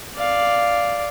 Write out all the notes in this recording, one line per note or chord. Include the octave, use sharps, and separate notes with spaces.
D5 F5